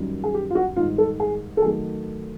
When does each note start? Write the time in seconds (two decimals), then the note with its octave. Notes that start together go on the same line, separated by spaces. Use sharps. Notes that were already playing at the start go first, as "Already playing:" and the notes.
Already playing: F#2 D#3 G3
0.24 G#4
0.34 G4
0.50 F4
0.55 F#4
0.76 G#2 D#3 G3 F4
0.98 A4
1.20 G#4
1.57 A4
1.62 D#3 F#3 A3 G#4